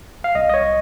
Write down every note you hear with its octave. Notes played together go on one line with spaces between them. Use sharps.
F5
C2 D#5
D#5
C#5